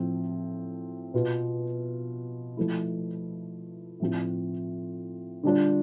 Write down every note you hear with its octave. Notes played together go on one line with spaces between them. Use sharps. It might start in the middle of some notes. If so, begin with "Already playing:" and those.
Already playing: A2 F3 C4
B2 B3 F4
F3 A3 E4
A2 F3 C4 F4
D3 G3 D4 F4